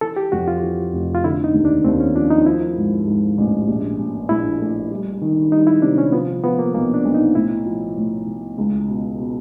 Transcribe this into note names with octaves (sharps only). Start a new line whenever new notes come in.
E3 A4
G4
F2 F#4
F4
E3
F1
F4
D3 E4
D#4
D#2
D4
D#2 C4
C#4
F3 D4
D#4
F3 E4
G#2
G#2
A1
A#1
A#2
A#1 E4
A3
G3
D#3
G3 D#4
E4
C3 D4
C#4
F3 B3
F3 B3
A#3
B1 A#3
D4
B1
D#4
A2 E4
F3
A2
A2
C#2
B2
B2